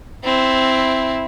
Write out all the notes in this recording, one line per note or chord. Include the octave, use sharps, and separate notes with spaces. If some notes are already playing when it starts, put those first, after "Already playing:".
C4 E4